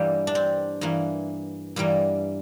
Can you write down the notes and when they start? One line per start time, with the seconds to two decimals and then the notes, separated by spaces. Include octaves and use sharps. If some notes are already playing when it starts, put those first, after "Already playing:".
Already playing: G2 E3 G3 A#3 G4
0.27 D4
0.35 C4
0.81 G2 E3 A#3
1.76 G2 E3 G3 A#3